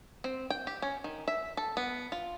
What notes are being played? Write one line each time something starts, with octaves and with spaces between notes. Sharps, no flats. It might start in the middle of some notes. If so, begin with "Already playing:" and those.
C4
G5
G4
C#4
D#3
E5
A4
B3
F4